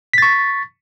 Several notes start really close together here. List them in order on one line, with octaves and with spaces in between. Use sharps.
B6 A6 C#6